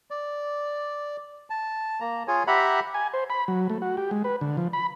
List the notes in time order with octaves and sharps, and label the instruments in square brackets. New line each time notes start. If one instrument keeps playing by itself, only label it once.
[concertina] D5
A5
A#3 A#5
F4 G#4 C#5 G#5
G4 E5 F#5 A#5 B5
[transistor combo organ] G#5
C5
B5
F#3
A3
F#4
G4
G#3
B4
D3
F3
B5